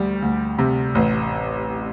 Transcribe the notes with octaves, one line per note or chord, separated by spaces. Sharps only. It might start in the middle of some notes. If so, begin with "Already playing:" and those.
Already playing: D2 G3
D2
C3
A1